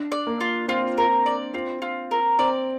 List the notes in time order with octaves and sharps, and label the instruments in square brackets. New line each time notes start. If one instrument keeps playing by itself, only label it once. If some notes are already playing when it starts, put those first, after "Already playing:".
Already playing: [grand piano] D4
[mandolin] D5
[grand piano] A#3
[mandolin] F4
[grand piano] C4 [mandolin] F4
[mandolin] A#4
D5
[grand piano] C4 [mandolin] F4
[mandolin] F4
A#4
[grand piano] C4 [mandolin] D5